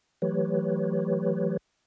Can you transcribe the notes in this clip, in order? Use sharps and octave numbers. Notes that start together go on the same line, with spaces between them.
E3 F#3 A3 G4 B4 C#5